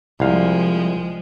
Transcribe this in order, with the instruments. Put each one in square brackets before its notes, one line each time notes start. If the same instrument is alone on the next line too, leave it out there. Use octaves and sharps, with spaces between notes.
[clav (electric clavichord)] C2 F5 [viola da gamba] F3 G#3